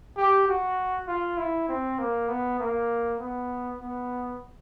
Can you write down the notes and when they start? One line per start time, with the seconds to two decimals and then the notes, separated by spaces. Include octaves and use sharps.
0.17 G4
0.48 F#4
1.08 F4
1.38 E4
1.69 C4
1.99 A#3
2.29 B3
2.60 A#3
3.19 B3
3.80 B3